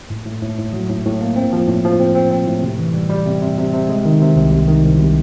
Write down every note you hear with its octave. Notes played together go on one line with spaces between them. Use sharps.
A2
A2
A2
A2
F#3
A2
A2
A#3
C4
F3
A2
F3
C4
C4
C4
A2
C3
E3
G3
G3
C3
C3
C3
C3
G#3
D#3
C3
C2
C3
D#3
C2
C3